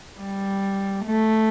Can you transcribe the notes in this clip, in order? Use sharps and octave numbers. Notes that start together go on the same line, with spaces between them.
G3
A3